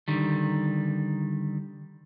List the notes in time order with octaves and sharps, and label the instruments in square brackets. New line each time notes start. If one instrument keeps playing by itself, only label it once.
[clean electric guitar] D3 D#3 G3